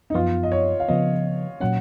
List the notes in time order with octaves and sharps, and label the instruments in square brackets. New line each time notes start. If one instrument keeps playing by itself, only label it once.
[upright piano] D#4
[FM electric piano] F#2 F3 B3 [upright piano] F4
[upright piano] D#5
C#5
F5
[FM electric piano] C#3 F3 B3 [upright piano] D#5
[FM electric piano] A#2 F#3 C#4 [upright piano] F#5